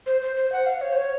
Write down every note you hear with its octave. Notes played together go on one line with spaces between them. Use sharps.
C5
C5
C5
F#5
F5
C#5
C5
C#5